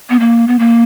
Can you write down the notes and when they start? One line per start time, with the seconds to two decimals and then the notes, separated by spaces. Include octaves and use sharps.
0.10 B3
0.19 A#3
0.48 B3
0.59 A#3